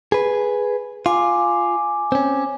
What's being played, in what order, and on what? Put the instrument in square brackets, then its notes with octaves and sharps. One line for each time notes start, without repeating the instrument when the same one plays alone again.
[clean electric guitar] G#4 B4
[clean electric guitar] F4 [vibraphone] G#5 D6
[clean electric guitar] C4 C#4